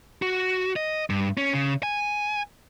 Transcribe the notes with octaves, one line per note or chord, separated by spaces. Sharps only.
F#4
D#5
G2
C#4
C#3
G#5